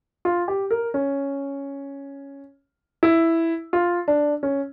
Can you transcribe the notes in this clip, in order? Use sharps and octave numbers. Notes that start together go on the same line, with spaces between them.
F4
G4
A#4
C#4
E4
F4
D4
C#4